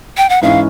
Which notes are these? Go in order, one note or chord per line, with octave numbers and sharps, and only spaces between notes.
G5
F#5
G#2 E3 G#3 C#4 E4 F5